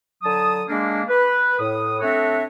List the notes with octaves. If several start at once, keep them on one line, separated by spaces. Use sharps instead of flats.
D3 F#3 A5 D#6
G#3 A#3 D4
B4
A2 D#6
A3 C4 D4 F#4 C#5 E5